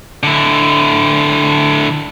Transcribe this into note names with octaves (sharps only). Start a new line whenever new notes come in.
D3 E4